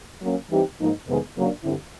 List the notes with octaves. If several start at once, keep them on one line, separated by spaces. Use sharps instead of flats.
F#3 A#3 C#4
E3 G3 C4 D#4 G4
G#2 F3 A#3 D#4
F2 C3 D#3 G#3 B3
C#3 F#3 A#3 D4
G2 D3 G3 C4 E4